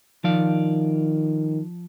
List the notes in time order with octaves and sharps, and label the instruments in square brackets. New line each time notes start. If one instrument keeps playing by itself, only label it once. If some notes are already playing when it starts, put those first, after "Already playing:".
[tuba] D#3 [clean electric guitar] F3 D5 F5